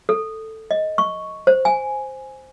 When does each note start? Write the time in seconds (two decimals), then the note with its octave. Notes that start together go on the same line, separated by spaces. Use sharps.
0.09 A4
0.71 D#5
0.98 C#6
1.47 C5
1.65 G#5